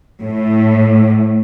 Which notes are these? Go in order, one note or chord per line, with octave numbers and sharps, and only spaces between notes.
A2